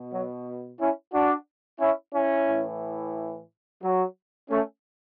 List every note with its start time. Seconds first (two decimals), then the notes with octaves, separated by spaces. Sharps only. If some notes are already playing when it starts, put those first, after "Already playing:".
Already playing: B2
0.13 F#3
0.79 C#4 E4
1.13 D4 F#4
1.80 C#4 E4
2.14 C#4 E4
2.47 A2 E3
3.82 F#3
4.50 A3 C#4